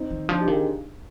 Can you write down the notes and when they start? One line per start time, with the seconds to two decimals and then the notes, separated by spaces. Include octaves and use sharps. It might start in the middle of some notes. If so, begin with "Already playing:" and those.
Already playing: C4 D#4
0.10 D#3
0.28 F3 D4 F4
0.41 D#4 G4
0.48 D#3
0.53 F4 G#4